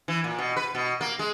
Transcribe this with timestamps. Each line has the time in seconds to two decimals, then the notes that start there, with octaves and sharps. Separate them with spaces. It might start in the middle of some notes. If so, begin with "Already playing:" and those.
0.08 E3
0.24 A#2
0.38 B2
0.57 B4
0.75 B2
1.01 A#3
1.19 G#3